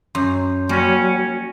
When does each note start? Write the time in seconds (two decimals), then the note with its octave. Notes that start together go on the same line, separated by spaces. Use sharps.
0.15 F#2 C6 G6
0.69 F#3 G3 A#3 C#4 A#6 C#7